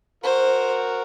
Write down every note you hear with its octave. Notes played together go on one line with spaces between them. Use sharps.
F#4 A#4 C5